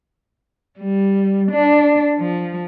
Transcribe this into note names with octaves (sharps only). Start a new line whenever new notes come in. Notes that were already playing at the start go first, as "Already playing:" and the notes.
G3
D4
F3